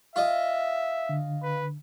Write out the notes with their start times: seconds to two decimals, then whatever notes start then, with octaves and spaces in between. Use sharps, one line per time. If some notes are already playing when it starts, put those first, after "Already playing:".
0.16 F4 D#5 E5
1.09 D3
1.43 B4